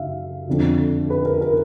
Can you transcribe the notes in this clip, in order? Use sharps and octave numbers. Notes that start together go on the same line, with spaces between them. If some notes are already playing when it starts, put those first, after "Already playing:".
Already playing: F#2 C#3 E5 F5
F2 D3 F3
B4
A#4
A#4